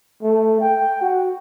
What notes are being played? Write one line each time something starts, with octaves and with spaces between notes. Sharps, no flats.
A3
G5
F#4